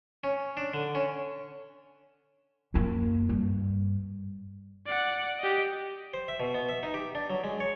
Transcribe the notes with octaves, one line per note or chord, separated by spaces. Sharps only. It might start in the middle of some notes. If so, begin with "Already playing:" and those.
C#4
D4
D3
C#4
F#2 A#3
G2
D5 F#5
G4 D#5
C5
E5
B2
B3
E5
D#4
G4
D4
F#3
G#3
C#5